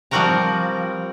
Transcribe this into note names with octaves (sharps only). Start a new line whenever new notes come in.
F3 G3 C4 F#4 A#4 A#5